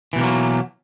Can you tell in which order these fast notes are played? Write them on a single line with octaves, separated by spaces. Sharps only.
E3 B2 D#3 A#3 F#3